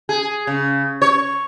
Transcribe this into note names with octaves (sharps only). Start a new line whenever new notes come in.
G#4
C#3
C#5